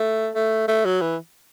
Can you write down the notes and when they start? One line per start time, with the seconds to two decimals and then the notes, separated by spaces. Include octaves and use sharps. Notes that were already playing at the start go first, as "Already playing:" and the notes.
Already playing: A3
0.35 A3
0.68 A3
0.85 F#3
1.01 E3